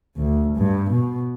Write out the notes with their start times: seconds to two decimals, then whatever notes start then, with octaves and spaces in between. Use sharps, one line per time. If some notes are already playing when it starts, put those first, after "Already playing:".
0.17 D2
0.57 G2
0.91 B2